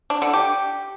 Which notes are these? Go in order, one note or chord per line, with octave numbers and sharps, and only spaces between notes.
D4
D3
G4